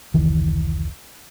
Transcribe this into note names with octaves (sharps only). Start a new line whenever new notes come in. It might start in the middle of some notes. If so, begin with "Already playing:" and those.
F1 C#2 D#3 E3